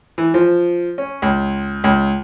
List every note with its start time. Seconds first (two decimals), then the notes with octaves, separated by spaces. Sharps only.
0.18 E3
0.34 F3
0.98 C#4
1.22 C#2
1.84 C#2